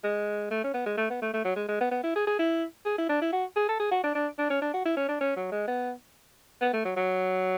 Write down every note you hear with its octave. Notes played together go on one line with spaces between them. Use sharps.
G#3
A3
C#4
B3
G#3
A3
B3
A3
A3
F#3
G#3
G#3
B3
B3
E4
G#4
G#4
E4
G#4
E4
D4
E4
F#4
G#4
A4
G#4
F#4
D4
D4
D4
C#4
D4
F#4
E4
C#4
D4
C#4
F#3
G#3
B3
B3
A3
F#3
F#3